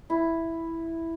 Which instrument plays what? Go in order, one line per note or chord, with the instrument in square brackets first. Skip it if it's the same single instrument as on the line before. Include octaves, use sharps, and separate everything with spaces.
[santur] E4